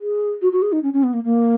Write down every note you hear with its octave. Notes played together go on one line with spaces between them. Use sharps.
G#4
F#4
F#4
G#4
D#4
C#4
C#4
B3
A#3
A#3